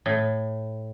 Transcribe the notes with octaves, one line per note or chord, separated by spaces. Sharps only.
A2